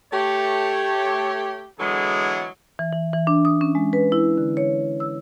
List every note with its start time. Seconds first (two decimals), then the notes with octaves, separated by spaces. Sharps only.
0.13 A3 G4 C#5
1.78 D3 E3 F#3 G#3 B3 G#4
2.79 E3
2.93 E3
3.13 E3
3.27 D4
3.45 D#6
3.61 C#4
3.75 G#3
3.93 B4
4.12 E4
4.38 D3
4.57 C#5
5.00 E6